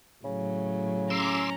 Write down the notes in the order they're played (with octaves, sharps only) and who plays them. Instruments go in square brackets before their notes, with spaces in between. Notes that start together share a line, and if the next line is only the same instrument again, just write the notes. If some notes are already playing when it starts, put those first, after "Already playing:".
[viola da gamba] A2 F#3 [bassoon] C#3
[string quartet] C#4 A#5 [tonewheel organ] C6 D6 E6